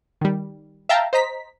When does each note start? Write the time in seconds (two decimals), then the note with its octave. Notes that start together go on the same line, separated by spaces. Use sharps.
0.21 D#3 G3
0.89 E5 F5 G5 A5 A#5
1.13 C5 D#5 A#5 B6